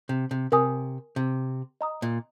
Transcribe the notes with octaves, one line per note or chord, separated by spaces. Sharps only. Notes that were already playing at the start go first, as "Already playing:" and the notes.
C3
C3
C3 A#4 G#5 D#6
C3
D#5 A#5 D#6
A#2